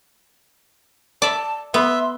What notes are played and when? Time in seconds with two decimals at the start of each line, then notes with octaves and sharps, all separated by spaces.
1.22 D5 E5 A5
1.74 B3 E5 C6